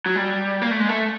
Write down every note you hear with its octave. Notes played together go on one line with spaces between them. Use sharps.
F#3
G3
A#3
A3
G#3
A3